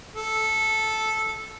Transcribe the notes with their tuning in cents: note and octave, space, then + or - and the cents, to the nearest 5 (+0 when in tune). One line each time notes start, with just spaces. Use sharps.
A4 -5